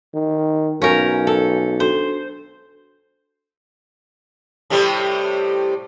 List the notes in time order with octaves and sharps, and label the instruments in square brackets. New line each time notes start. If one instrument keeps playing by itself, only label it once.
[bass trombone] D#3
[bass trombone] B1 [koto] C#4 A#4 [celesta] F5 G#5 G6
[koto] A4
[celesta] D4 F#4 A4 [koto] C5
[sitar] A2 C3 G3